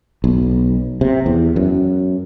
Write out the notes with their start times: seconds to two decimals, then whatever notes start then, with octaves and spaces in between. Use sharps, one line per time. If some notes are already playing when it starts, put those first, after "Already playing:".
0.24 B1
1.01 C3
1.26 E2
1.56 F#2